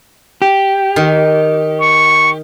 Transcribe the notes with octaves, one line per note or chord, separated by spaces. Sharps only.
G4
D#3
C#6